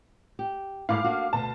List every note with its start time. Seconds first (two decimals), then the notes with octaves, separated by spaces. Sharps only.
0.39 G4
0.89 G#2 A3 E4 F5 D6 F6
1.04 A#3 D4 F#4
1.33 D2 B2 A5